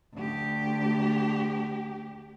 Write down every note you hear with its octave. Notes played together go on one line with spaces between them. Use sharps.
D2 G4